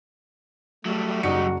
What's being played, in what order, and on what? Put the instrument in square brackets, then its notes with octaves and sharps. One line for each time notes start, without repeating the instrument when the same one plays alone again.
[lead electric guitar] F#3 G3 [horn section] A3
[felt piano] F#1 D5 C#7 [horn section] D#4 [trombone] F#4